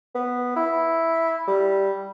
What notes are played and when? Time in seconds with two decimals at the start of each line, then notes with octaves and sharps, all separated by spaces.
0.15 B3
0.56 E4
1.47 G3